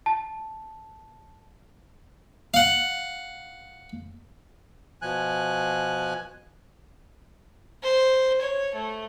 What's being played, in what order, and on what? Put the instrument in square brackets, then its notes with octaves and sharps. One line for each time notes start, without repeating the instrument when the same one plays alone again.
[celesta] A5
[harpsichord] F5 F#5
[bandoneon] B2 F3 G#5 F#6
[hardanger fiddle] C5
C#5
A3